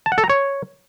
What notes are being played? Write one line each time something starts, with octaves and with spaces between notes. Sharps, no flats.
A5
F#5
A4
A#5
C#5